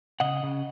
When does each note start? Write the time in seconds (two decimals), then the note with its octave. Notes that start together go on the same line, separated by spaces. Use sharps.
0.20 C#3 D#5 F#5
0.43 C#3